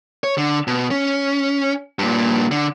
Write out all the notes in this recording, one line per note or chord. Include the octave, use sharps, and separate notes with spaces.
C#5
D3
B2
C#4
G2 A#2
D3